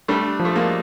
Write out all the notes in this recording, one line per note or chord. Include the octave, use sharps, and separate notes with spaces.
G3 A3 D4
F3
A3
G#3 A#3